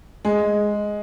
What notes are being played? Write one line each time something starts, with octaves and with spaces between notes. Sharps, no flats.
G#3